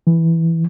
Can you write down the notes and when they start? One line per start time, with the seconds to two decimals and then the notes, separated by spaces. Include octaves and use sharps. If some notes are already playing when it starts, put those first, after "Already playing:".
0.07 E3